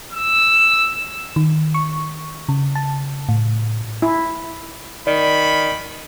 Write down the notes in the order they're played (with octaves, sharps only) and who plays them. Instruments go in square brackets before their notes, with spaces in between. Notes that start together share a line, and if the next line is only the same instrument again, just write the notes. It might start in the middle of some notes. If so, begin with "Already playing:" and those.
[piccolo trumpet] E6
[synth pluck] D#3
C#6
C#3
A5
A2
[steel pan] E4
[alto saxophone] D#3 [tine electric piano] D5 [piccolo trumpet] B5